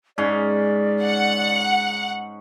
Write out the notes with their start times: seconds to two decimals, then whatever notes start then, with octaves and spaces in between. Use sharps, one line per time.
0.18 G#2 C#4 D5
1.03 F#5